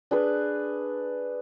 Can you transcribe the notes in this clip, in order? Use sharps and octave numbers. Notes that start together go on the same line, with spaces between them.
D4 G#4 B4